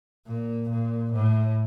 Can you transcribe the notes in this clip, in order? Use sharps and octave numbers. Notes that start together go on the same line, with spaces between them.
A#2
A#2
A2